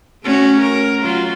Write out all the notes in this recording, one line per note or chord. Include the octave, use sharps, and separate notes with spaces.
A3 C#4 F#4
A#4
F#3 F4